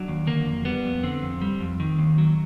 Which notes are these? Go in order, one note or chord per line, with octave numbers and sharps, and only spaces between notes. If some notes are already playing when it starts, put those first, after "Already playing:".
Already playing: F#3 D4
D#2
D3 A#3
F2
G3 B3
F2
D3 C4
F2
G3
F2
D#3
D#2
F#3